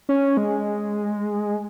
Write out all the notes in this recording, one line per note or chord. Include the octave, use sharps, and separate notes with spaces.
C#4
G#3